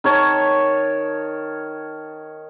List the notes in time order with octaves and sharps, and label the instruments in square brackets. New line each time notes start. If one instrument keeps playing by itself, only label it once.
[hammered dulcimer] D#3 A#4 C#5 A5